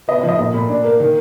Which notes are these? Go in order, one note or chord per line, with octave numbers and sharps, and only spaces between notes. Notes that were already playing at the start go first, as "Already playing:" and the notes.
B3 D#5
D#5
F3
D#5
A#2 D#5
A#2 B5
D4 D5
A#3 A#4
D#3